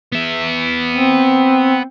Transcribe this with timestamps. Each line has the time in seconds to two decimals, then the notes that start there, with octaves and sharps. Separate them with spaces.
0.12 B3 E5
0.91 C4